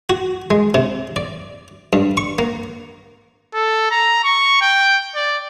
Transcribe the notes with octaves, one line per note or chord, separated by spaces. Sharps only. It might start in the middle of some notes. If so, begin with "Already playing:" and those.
F#4
G#3
C3
D5
G2
C#6
A#3
A4
A#5
C#6
G5
D5